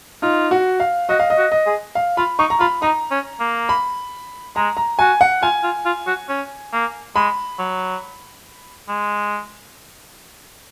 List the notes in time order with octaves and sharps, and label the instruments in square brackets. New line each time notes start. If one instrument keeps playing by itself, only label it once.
[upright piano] D#4 [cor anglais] F4
[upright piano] F#4
F5
[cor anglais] F#4 [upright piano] D#5
[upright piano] F5
D#5
[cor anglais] F#4
[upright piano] D#5
[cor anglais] G#4
[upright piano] F5
[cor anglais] F4 [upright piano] B5
[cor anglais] D#4 [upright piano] C#6
[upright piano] A#5
[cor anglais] F4 [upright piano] B5
[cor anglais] D#4 [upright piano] A#5
[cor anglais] C#4
A#3
[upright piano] B5
[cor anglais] G#3 [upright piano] A#5
[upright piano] A#5
[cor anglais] F#4 [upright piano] G#5
[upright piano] F#5
[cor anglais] F4 [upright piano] G#5
[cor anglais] F4
F4
F#4
C#4
A#3
[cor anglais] G#3 [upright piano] B5
[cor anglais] F#3
G#3